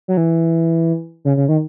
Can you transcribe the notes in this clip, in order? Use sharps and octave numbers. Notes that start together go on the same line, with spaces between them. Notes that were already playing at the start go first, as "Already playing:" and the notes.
F#3
E3
C#3
C#3
D#3